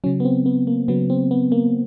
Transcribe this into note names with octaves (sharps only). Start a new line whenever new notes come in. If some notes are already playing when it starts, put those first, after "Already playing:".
C#3 F#3 C#4
B3
C4
B3
A#3
C#3 F#3 B3
C4
B3
A#3